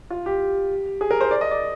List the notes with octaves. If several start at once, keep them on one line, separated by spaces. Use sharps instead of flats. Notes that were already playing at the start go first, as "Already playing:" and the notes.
F4
G4
G#4
A#4
C5
D5
D#5
D5